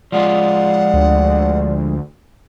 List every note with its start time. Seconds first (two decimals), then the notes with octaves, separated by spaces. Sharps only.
0.12 F3 G#3 F4 D5 F#5
0.94 D2